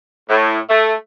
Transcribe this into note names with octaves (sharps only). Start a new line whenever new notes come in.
A2
A3